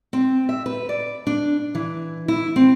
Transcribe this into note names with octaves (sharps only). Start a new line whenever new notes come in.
C4
E5
B4
D5
D4
E3
E4
C4